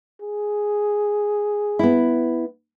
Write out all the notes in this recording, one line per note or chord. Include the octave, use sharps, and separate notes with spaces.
G#4
B3 E4